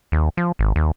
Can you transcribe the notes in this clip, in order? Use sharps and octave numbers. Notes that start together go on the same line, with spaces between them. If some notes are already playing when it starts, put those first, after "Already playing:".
D#2
F3
G#1
D#2